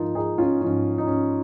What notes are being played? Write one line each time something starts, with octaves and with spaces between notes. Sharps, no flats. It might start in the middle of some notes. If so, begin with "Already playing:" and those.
Already playing: G#2 F3 D#4 F4 A#4
D#4 G#4
C#4 F4
G#2 F3 C#4
D#4
C#4